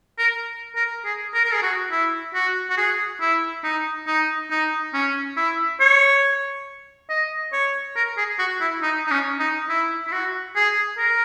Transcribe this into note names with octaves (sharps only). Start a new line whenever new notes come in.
A#4
A#4
G#4
A#4
A#4
G#4
F#4
E4
F#4
F#4
G#4
E4
D#4
D#4
D#4
C#4
E4
C#5
D#5
C#5
A#4
G#4
F#4
E4
D#4
D#4
C#4
D#4
E4
E4
F#4
G#4
A#4